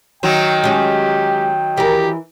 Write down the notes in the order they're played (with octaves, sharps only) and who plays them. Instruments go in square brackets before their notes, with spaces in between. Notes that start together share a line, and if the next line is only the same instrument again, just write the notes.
[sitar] D#3 F#3 F#4 [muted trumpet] G5
[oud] G#3 C#4 [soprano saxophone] G4
[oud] E3 A#4 [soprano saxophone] G4